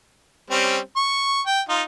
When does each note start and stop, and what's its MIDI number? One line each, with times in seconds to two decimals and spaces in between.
0.50 0.78 55
0.50 0.78 60
0.50 0.78 61
0.96 1.40 85
1.46 1.61 79
1.69 1.82 63
1.69 1.82 65